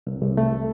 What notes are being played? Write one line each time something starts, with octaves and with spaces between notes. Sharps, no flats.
C2
C2
A3